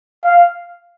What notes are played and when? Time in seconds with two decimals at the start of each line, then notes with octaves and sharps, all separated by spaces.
0.24 F5